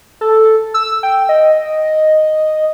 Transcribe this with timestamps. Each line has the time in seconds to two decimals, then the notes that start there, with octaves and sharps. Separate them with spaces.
0.21 A4
0.74 E6
1.03 G5
1.29 D#5